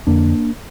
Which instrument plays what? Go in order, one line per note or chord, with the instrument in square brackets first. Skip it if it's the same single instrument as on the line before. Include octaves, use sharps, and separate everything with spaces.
[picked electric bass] F2 D3 A#3 D4